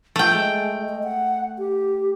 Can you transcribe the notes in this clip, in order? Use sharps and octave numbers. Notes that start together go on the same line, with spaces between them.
F3 A3 G5
G#3
D#5
F#5
G4